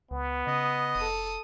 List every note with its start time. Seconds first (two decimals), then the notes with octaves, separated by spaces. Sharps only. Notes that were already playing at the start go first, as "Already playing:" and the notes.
0.11 C#2 B3
0.47 C#3 D#5
0.96 F1 A4 D#6